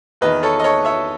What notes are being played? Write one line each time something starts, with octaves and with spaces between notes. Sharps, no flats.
E2 D#3 B4 D#5
A4 C#5
D#5
A4 C#5
C#5 E5